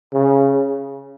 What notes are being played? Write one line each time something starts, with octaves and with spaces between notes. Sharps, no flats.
C#3